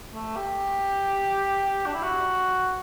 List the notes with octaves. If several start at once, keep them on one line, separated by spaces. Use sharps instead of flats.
A3
G4
D4
E4
F#4